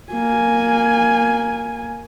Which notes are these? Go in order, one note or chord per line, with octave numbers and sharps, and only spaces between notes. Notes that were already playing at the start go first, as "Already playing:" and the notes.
A#3 G#5